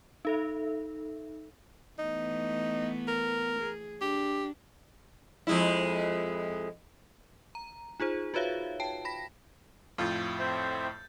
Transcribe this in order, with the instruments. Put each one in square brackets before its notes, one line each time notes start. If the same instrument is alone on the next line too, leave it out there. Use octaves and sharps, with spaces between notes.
[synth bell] D#4 A4 E5
[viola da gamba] E3 A3 B3 [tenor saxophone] D#4
[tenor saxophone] A#4
[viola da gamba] G#4
[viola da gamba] D4 [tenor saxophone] G4
[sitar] F2 G#3 E4
[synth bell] A#5
D#4 F4 G#4 C5
F4 F#4 B4 C#5 E5 F5
G5 A5
B5 A#6 B6
[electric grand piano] F2 A2 [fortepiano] F4 [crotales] G6 A6
[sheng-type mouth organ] C4 C5 E5